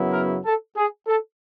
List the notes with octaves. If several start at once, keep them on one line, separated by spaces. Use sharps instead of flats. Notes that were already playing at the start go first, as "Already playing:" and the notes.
Already playing: F#2 C#3 F#3 B3 E4
A#4
A4
G#4
A4